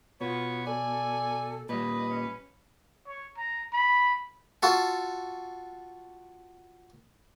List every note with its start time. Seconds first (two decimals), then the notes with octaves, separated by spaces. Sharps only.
0.21 B2 B3 F4 C#5
0.66 A4 D5 G#5
1.69 A#2 G3 B4 D#5
2.10 C#4
3.07 C#5
3.37 A#5
3.73 B5
4.63 F4 F#4 A4